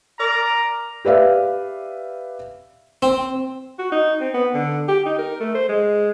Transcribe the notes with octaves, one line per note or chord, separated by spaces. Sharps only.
A#4 D5 A#5
G4 B4 D5 E5 F5
C4
F#4
D#4
C4
B3
D3
G4
D#4
A#4
A3
C5
G#3